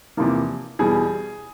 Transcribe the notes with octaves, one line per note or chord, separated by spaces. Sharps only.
E2 C3 F3 A#3
E2 B2 G3 G#4